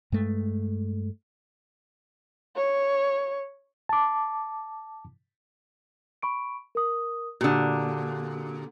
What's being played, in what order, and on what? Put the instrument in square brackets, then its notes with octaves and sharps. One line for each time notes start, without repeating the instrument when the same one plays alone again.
[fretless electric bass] G2 G#3 A3
[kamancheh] C#5
[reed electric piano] A5 D6
[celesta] B5 C#6 D7
A#4 D#6
[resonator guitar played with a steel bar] A#2 D3 [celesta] F#4 G4 D#6